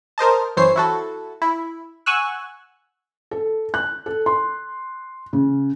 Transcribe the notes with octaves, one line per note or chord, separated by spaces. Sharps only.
A#4 C5 D#5 A5
F#2 E3 C5 C#5 C7
E4 F#4 A4
E4
F#5 G#5 C#6 E6 F#6
A4
F#6
A4
C6
C#3